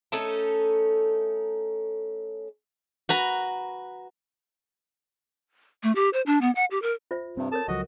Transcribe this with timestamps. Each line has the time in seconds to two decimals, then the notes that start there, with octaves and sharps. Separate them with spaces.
0.12 A3 C#4 D#4 A4
3.09 F#4 B4 A#5
5.83 A3
5.95 G4
6.13 C5
6.26 D4
6.41 B3
6.55 F#5
6.71 G4
6.82 A#4
7.11 F4 C5 E5
7.37 G2 C3 C4
7.52 A4 A#4 C#5 A5
7.68 C#2 F3 F#3 F#4 D#5